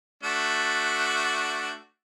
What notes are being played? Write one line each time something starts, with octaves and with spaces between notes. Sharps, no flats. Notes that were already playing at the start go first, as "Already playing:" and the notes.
A3 D4 F#4